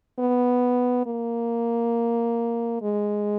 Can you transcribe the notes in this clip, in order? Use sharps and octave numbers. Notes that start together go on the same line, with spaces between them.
B3
A#3
G#3